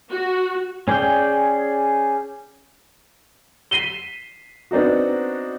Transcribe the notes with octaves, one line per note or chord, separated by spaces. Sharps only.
F#4
C#4 G#4 D5 G5
B6 C7 D#7 E7 G7
B3 C4 D4 D#4 F#4